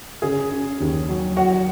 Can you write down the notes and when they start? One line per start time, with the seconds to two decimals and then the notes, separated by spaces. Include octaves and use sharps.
0.22 C#3 G#4
0.51 C#4
0.80 D#2
1.09 F#3
1.37 F#3 F#4